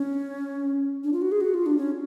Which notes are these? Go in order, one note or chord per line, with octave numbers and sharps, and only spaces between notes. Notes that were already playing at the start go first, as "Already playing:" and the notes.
Already playing: C#4
D4
F4
F#4
G#4
F#4
F4
D4
C#4